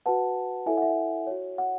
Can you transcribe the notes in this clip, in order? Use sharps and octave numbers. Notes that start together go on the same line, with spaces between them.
F#4 B4 F#5 A5
E4 A4 C#5 E5 G#5
F#5
E5
F#4 C#5
F#5